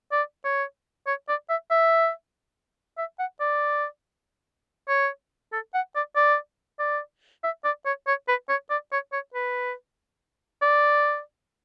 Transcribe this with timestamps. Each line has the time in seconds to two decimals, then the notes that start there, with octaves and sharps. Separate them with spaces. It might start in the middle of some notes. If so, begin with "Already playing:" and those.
0.12 D5
0.44 C#5
1.07 C#5
1.29 D5
1.49 E5
1.71 E5
2.98 E5
3.19 F#5
3.41 D5
4.89 C#5
5.53 A4
5.74 F#5
5.95 D5
6.16 D5
6.80 D5
7.44 E5
7.64 D5
7.86 C#5
8.07 C#5
8.28 B4
8.49 C#5
8.70 D5
8.92 C#5
9.13 C#5
9.34 B4
10.62 D5